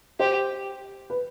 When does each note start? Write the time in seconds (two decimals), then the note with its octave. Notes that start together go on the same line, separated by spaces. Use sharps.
0.20 G4 C5
1.10 B4